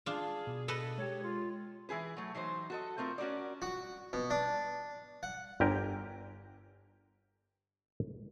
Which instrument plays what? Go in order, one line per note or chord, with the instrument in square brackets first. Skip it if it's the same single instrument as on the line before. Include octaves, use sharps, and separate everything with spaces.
[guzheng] D4 F4 [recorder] G#4
[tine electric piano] B2
[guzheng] A4 B4 D#5
[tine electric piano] G#3 G4 [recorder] C#5
[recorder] F4
[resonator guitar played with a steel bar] E3 E4 G#4 B4
F#3 A3
E3 F#3 D#4 C5
F#4 A4 D#5
A3 C4 F4 A#4
C#4 F#4 A#4 D5
[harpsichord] F#4
B2
D4
F#5
[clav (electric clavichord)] G1 D3 G4 A#4 G5 G#5